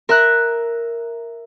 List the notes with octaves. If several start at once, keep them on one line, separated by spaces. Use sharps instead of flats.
A#4 E5 A#5 F#6